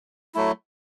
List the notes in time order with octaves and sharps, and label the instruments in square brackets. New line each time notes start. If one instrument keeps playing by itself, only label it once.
[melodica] F#3 A3 E4